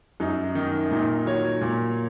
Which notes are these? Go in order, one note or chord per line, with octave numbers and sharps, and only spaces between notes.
F#2 D#4
D#3 D#4
A#2 D#4
F#3 C#5
A#2